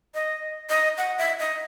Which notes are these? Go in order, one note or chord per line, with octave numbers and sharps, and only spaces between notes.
D#5
D#5
F#5
E5
D#5